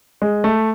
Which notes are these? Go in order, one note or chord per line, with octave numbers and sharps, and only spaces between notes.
G#3
A3